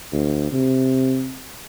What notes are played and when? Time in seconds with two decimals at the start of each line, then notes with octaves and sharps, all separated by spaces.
0.12 D2
0.52 C3